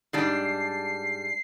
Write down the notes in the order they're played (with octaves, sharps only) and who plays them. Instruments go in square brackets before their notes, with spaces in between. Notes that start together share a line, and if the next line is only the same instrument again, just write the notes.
[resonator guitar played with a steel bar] G#2 G3 D4 [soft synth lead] C7